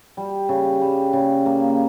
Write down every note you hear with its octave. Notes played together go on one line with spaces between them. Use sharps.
G3
C#3
G3
C#3
A#3